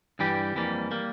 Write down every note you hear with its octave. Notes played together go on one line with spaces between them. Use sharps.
G2 E3 G3 G4
F2 E3 G3 A#3
G3 A#3